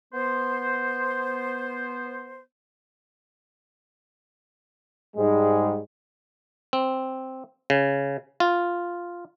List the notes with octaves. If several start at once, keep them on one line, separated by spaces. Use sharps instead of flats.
B3 C5
G#2 G3 G#3
C4
C#3
F4